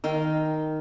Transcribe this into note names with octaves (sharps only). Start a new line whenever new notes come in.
D#3 A#4 F5 G5